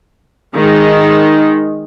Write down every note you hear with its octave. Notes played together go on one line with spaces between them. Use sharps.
D#3 G#3 D#4